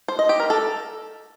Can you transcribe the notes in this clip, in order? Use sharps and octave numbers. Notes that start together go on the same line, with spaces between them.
C5
D#5
G4
A#4
A4